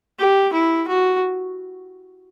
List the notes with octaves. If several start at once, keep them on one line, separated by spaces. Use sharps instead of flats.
G4
E4
F#4